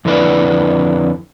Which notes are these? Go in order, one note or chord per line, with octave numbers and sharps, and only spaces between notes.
F2 D3 E4 B4 D5